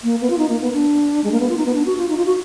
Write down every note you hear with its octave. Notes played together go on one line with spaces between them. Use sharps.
A#3
B3
F4
D#4
A#3
B3
D4
G#3
A#3
B3
F4
D#4
B3
D4
F#4
F4
D#4
F4
F#4